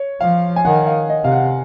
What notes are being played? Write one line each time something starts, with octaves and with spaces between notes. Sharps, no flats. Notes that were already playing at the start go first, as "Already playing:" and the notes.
Already playing: C#5
F3 F5
G#5
D#3 F#5
F5
D#5
C3 F5
F#5